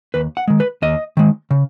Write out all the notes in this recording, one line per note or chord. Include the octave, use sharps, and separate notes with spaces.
D#2 B4
F#5
D#3 G#3
B4
D#2 D#5
D#3 G#3
C#3